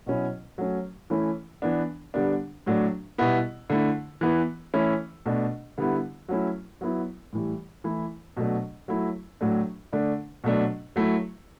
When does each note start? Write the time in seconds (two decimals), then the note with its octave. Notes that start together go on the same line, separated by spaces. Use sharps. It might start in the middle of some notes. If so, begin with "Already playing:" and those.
0.06 B2 F#3 C#4 E4
0.58 F#3 A3 C#4
1.10 E3 A3 C#4 E4
1.62 E3 B3 D4
2.14 D3 G3 B3 D4
2.66 A2 F#3 A3 D4
3.18 B2 G3 B3 E4
3.70 D3 A3 E4
4.21 E3 B3 E4
4.74 E3 A3 C#4 E4
5.26 B2 A3 D4
5.78 D3 G3 B3 E4
6.28 F#3 A3 C#4 E4
6.81 F#3 B3 E4
7.33 A2 E3 G3
7.84 E3 A3 E4
8.37 B2 F#3 A3 D4
8.88 F#3 A3 E4
9.41 A2 F#3 A3 D4
9.93 D3 A3 D4
10.44 B2 F#3 A3 D4
10.96 F#3 A3 E4